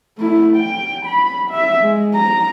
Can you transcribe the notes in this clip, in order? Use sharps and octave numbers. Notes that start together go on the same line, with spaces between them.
A3 E4
G5
B5
E5
G#3
A#5